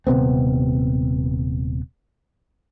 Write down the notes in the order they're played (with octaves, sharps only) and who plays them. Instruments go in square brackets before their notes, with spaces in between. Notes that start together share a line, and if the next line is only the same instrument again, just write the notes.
[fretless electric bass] D#1 C3 B3 C4